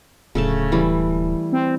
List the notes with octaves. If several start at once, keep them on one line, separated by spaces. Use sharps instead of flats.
D1 C#3 A3 A5
E3 G3
C4